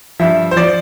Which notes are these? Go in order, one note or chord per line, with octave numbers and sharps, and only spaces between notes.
G2 F3 E5
C5
F3 D5